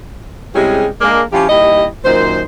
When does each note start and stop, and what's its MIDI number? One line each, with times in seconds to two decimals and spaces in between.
0.55 0.86 48
0.55 0.86 55
0.55 0.86 56
0.55 0.86 61
0.55 0.86 64
0.55 0.86 68
1.01 1.22 56
1.01 1.22 58
1.01 1.22 62
1.33 1.49 53
1.33 1.49 61
1.33 1.49 64
1.33 1.49 65
1.33 1.49 67
1.49 1.85 39
1.49 1.85 55
1.49 1.85 64
1.49 1.85 75
2.04 2.42 42
2.04 2.42 46
2.04 2.42 51
2.04 2.42 72